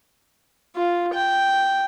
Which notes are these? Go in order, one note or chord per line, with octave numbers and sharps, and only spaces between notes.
F4
G5